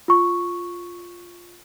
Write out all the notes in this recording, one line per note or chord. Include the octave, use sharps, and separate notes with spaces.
F4 C#6